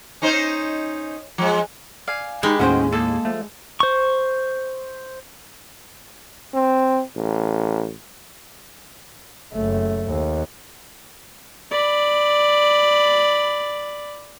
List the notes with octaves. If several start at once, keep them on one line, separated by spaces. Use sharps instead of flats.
C#4 D#4 C5
F3 G#3
D5 F5 G#5
G#3 D#4 G4 B4
D#2 A2 C#4 F#4 C5 G5
A#3 A4
F3 A3
C5 C#6
C4
A1
F#1 A3
D#2
D5 B5